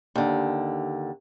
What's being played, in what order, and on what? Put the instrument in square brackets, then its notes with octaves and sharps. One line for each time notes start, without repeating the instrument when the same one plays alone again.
[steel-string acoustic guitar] D#2 D3